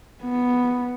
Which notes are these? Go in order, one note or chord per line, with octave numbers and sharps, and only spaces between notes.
B3